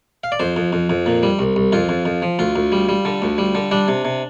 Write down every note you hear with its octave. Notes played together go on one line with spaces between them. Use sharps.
F5
D5
F2 C5
F2
F2
F2
A#2
G3
C2
C2
F2 F4
F2
F2
F3
D2 F4
D2
G3
G3
D3
D2
G3
D3
G3 D4
C3
C3